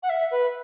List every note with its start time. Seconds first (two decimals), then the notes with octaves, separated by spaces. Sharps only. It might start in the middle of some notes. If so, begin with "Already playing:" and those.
0.03 F#5
0.09 E5
0.31 B4